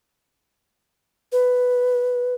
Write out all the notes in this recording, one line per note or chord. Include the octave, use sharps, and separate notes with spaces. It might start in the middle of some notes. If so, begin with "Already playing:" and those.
B4